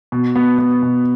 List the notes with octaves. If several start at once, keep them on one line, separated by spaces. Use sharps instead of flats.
B2
B3
B3
B2